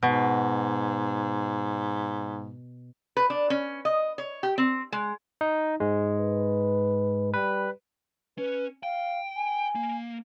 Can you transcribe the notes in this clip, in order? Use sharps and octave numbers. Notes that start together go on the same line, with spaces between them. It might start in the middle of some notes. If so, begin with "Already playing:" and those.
G#2 B2
B4
D4
C#4
D#5
C#5
G4
C4
G#3
D#4
G#2 G#3
B4
G3 B4
C#4 B4
F5 G5
G#5
A#3